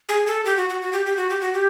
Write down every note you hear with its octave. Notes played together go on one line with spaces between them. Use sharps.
G#4
A4
G4
F#4
F#4
F#4
G4
G4
F#4
G4
F#4
G4